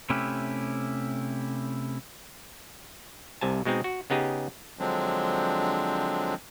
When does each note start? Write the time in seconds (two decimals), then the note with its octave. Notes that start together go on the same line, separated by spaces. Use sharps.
0.10 C3 A3 C#4 E4 G4 B4
3.41 C2 C3 G#5 A5
3.65 B2 G#3 C4 D#4
3.84 F#4
4.10 C#3 B3 D#4 G4 G#4
4.79 D3 F3 F#3 G#3 C4 D4